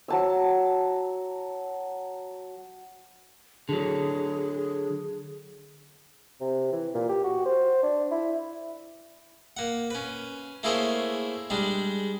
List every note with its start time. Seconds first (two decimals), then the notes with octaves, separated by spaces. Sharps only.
0.08 F#3 A5 E6
3.69 D3 F#3 G#4
6.40 C3
6.72 E3
6.94 A#2
7.09 G4
7.23 F#4
7.45 C5
7.83 D4
8.11 E4
9.57 A#3 F#5
9.90 C#4 B4
10.63 A3 A#3 E4 G#4 C5 C#5
11.50 G3 G#3 D4